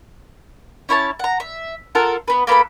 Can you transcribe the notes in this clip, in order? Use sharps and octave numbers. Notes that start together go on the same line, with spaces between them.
C#4 E4 C#5 A5
F#5 A#5
E5
F4 A4 A#4 F#5
B3 B4
A#3 B3 A4 B5